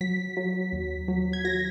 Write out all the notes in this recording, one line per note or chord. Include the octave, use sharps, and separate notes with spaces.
F#3 B6
F#3
D#2
F#3
G#6
F#3 A#6